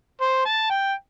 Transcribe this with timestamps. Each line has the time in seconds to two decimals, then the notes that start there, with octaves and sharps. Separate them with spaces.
0.21 C5
0.45 A5
0.70 G5